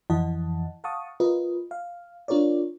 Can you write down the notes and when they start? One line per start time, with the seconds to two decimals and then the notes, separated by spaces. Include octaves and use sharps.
0.10 F2 E3 E4 D#5 F#5 A5
0.84 F5 F#5 A5 C#6 D#6
1.20 F4 A#4 B4 D#5
1.71 F5
2.28 D4 F4 A#4 C#5 D5